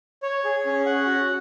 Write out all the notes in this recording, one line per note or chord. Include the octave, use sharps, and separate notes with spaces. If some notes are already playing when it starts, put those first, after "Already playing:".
C#5
G#4
C#4
F#5
F#4